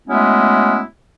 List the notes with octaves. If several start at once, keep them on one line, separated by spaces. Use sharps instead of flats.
F#3 G#3 A3 B3 C#4 E4